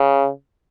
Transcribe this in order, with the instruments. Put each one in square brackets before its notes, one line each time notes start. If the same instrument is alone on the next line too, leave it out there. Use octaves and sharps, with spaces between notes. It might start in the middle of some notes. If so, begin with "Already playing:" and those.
Already playing: [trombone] C#3